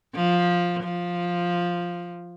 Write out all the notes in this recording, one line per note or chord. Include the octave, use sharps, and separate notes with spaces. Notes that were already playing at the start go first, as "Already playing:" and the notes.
F3
F3